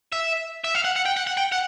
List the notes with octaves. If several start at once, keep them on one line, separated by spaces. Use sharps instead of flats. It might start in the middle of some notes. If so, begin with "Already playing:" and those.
E5
E5
F5
F#5
F#5
G5
F#5
F#5
G5
F#5